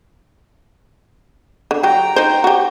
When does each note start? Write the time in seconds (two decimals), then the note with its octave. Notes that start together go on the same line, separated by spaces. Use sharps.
1.71 D3
1.83 F#3 G4 G5 A#5
2.16 D#4 C5
2.44 F#4 G4